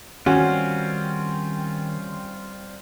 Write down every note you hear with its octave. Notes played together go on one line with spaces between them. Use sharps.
D#3 G3 C4 C#4 F4 F#4